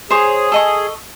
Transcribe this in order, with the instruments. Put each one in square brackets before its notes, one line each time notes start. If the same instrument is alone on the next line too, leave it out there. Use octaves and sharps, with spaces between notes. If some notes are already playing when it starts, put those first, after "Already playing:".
[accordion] G#4 [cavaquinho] C5 C#5
[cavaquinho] A4 D#5 C#6